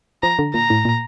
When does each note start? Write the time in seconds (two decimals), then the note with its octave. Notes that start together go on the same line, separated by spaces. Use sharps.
0.23 F3 A#5
0.39 D3
0.54 A#2 A#5
0.70 A2
0.85 A#2